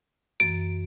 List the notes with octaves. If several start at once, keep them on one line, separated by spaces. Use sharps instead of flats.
F#2 E3 A6 D7